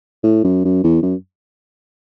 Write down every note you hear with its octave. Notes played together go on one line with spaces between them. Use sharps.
A2
F#2
F#2
E2
F#2